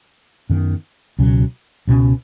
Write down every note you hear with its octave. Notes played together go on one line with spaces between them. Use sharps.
F#2 D#3 B3
C#2 B2 F#3 C#4
C#2 B2 F#3 C#4